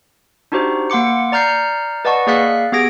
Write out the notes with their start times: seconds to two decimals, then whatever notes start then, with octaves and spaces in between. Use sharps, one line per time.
0.52 D4 D#4 F#4 G4 C5
0.90 A#3 F#5 C6 D6 C#7
1.32 D5 A#5 F6 G6 C7 C#7
2.05 B4 D5 D#5 F#5 A5 C#6
2.27 A#3 G#4 D5 F5 F#6 B6
2.72 B3 G4 G#4 G#6 A#6 D7